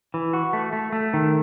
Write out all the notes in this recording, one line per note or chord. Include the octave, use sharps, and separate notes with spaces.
E3
F#4
A3
A3
A3
D#3